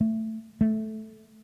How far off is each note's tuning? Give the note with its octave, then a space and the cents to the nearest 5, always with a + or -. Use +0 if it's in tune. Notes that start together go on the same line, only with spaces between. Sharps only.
A3 +10
A3 -10